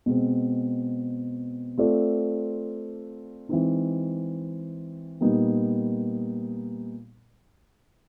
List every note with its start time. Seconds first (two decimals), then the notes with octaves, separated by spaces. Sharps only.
0.06 B2 G#3 C4
1.77 A3 C4 F4 A4 D5
3.49 E3 G#3 C4 D#4
5.21 A#2 G3 B3 D#4